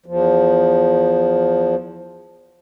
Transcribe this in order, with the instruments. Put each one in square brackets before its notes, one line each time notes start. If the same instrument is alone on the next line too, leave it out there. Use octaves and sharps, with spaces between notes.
[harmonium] E2 F3